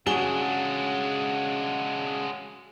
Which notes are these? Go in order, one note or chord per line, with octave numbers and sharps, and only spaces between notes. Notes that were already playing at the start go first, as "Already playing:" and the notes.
C#3 G#3 D4 F#4 G#4 F#5 E7 G7